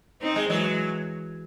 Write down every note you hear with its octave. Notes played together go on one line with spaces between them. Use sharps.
C4 D#4
G#3
E3 F#3 G#3